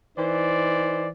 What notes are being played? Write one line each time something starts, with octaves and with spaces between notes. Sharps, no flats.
E3 D#4 C5 D5